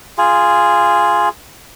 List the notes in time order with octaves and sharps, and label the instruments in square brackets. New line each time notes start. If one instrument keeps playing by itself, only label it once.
[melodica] F4 G#4